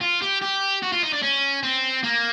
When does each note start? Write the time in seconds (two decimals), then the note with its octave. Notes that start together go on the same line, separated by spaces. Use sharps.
0.01 F4
0.22 G4
0.42 G4
0.83 F#4
0.92 F4
1.03 D#4
1.13 D4
1.23 C#4
1.63 C4
2.04 A#3